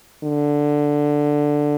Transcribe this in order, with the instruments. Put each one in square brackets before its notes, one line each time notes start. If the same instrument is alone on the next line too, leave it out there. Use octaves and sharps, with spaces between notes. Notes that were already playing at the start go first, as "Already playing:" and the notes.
[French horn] D3